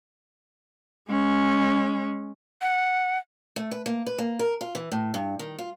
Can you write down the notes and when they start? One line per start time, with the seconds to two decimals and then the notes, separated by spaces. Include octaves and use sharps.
1.09 G#3 C#4
2.62 F#5
3.56 A3
3.71 B4
3.86 A#3
4.06 B4
4.18 A#3
4.39 A#4
4.61 F4
4.75 E3
4.92 A2
5.14 G2
5.39 D#3
5.59 F4